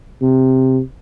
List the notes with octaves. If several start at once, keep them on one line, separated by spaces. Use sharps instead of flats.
C3